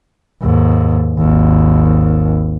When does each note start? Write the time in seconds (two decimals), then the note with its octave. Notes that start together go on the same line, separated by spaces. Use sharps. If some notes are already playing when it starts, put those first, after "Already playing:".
0.42 D#2 G#2
1.18 G#1 D#2